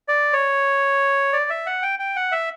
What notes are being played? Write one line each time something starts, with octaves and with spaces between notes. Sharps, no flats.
D5
C#5
D5
E5
F#5
G5
G5
F#5
E5